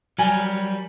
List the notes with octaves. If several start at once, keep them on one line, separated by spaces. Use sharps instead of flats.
F#3 G3 A#4 G#5